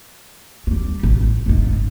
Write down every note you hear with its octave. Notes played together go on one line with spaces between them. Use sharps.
F#3 G3
A1
F#1 G#2